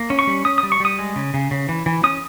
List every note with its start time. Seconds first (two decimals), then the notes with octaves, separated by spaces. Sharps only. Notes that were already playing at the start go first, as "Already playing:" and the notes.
Already playing: A#3
0.10 C#4
0.19 C#6
0.27 G3
0.45 C#4 D#6
0.58 D#6
0.63 G3
0.72 C#6
0.80 G3 D#6
0.99 G#3
1.16 C#3
1.34 C#3
1.51 C#3
1.69 E3
1.86 E3
2.03 C#4 D#6